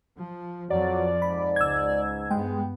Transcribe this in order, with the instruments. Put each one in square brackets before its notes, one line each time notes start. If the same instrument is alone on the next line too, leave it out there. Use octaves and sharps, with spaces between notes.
[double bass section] F3
[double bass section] F2 F3 [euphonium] F#3 [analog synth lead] D5
[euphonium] G#2 [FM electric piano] B5
[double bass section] C#2 [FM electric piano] E6 G#6
[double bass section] G2 B3 [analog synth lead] G#3 [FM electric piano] G5